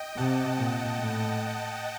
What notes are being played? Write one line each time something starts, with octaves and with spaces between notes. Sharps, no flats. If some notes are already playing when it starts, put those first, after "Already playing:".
Already playing: D#5 G5
C3 F#5 A5
A#2
A2